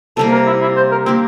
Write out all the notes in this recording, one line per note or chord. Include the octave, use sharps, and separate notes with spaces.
C3 G3 A#3 A4
A#4
E4
E4
C5
A#4
A#3 C4 D4 G4